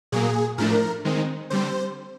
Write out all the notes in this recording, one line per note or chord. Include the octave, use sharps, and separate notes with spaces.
A#2 F#3 A#3 G#4
A2 F3 A3 D4 A#4
D#3 G#3 C4 D#4
D3 G3 C4 C5